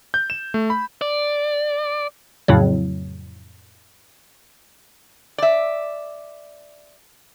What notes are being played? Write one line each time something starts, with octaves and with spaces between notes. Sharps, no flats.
G6
E7
A3
B5
D5
F2 A2 C#3 F#3
D5 E5